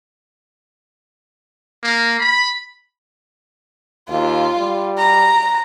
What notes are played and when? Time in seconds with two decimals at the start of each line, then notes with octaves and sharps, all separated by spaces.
1.83 A#3
2.20 B5
4.09 D#2 F4
4.58 G3
4.98 A#5